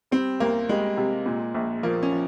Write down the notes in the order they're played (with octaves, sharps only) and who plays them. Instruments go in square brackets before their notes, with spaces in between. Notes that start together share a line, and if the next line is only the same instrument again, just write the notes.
[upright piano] G3 [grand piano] C4
[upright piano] C2 [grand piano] A#3
[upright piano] G3 [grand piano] G#3
[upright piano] C3
A#2
A#1
[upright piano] F3 [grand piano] A#3
[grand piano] C#4
[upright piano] F3